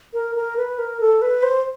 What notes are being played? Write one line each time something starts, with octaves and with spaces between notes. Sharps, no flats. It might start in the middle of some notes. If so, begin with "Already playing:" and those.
A#4
A#4
B4
A#4
A4
B4
C5